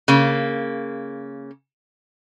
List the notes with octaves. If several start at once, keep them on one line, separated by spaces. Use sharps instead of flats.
C#3 A#3